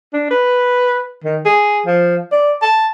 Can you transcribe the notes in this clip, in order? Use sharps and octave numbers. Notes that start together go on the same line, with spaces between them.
D4
B4
D#3
G#4
F3
D5
A5